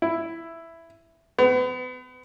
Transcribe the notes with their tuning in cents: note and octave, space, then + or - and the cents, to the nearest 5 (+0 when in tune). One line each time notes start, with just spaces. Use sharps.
E4 +5
B3 +35